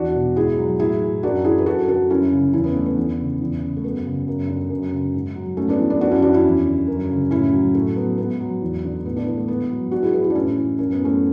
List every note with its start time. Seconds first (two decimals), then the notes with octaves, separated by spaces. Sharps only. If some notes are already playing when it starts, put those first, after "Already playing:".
Already playing: E2 D4 F#4
0.15 B2
0.36 G#2 E4 G#4
0.57 F#3
0.79 A2 E4 G#4
1.02 E3
1.23 F#2 D4 F#4
1.44 E3 E4 G#4
1.58 B4
1.66 F#2 F#4 A4
1.88 D3 F#4 A4
2.10 F#2 C#4 E4
2.32 C#3
2.53 E2 C#4 E4
2.64 B3
2.76 D3 A3
2.86 B3
2.97 E2
3.19 C#3
3.41 E2
3.62 C#3
3.77 A3
3.83 F#2 B3
4.06 C#3
4.27 F#2
4.49 D3
4.70 F#2
4.92 C#3
5.14 G#2
5.35 F#3
5.57 G#2 A3 C#4
5.69 B3 D4
5.79 E3
5.90 B3 D4
6.00 F#2 D4 F#4
6.11 C#4 E4
6.22 E3 D4 F#4
6.33 C#4 E4
6.45 E2
6.66 D3
6.87 F#2
7.10 C#3
7.31 A2 C#4 E4
7.53 F#3
7.75 A2 A3
7.96 F#3 B3
8.18 G#2 B3
8.40 F#3
8.62 E2
8.84 D3
9.05 A2 B3
9.16 B3 D4
9.27 E3 B3
9.37 A3
9.48 G#2 B3
9.71 F#3
9.91 G#2 D4 F#4
10.03 E4 G#4
10.13 E3 G#4 B4
10.24 E4 G#4
10.30 D4
10.35 A2 C#4 E4
10.58 E3
10.79 F#2 C#4
10.92 B3
11.00 E3 A3 C#4